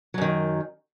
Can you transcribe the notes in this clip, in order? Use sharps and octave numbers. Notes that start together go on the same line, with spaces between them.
F#2 D#3 F#3